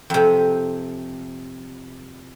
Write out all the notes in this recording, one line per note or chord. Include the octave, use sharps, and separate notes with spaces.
F2 C3